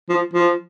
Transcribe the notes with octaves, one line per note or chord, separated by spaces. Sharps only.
F3
F3